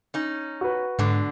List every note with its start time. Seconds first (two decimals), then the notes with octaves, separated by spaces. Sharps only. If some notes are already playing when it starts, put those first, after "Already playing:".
0.14 C#4 D#4
0.61 F#4 B4
0.99 G#2 B2 D3